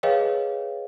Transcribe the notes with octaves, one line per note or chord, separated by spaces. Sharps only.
G#4 B4 C#5 D#5 F5 G5